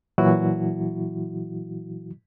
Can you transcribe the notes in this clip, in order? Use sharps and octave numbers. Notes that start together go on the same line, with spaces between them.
A#2 E3 F#3 E4 F#4